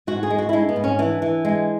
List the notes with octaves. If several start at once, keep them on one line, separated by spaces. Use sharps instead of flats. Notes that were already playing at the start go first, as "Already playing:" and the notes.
G#2 F#4
G#4
G#3
F#4
E4
G#3 D4
B3
G#2
C#4
E3 D4
E3
G#3